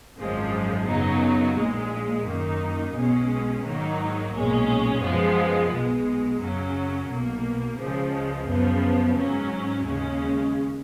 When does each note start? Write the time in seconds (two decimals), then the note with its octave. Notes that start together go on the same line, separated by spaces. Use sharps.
0.17 G#1 F#2 F3 G#3
0.87 F#2 C#3 F#3 B3 D#4
1.56 A#1 A#2 G#3
2.25 F#2 D#3 A#3 D#4
2.94 B1 B2 G#3 C#4
3.64 G#2 D#3 F#3 A#3 D#4
4.33 B1 A#2 G#3 C#4
5.02 F#2 F3 G#3 B3
5.71 B1 B2 G#3
6.40 F#2 C#3 F#3 C#4
7.09 B1 B2 A#3
7.78 C#2 C#3 F3 G#3
8.48 F#2 C#3 F3 B3
9.17 G#2 F#3 C#4
9.86 D#2 C#3 G#3 C#4